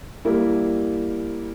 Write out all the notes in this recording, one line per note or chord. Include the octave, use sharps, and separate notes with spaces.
G3 A#3 E4